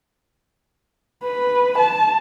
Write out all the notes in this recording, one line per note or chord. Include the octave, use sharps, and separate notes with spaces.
B4
A5